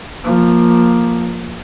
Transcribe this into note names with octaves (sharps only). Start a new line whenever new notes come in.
F3 A#3